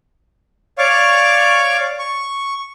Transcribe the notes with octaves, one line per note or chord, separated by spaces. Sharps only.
C#5 D5 F5 C#6 D6
C#6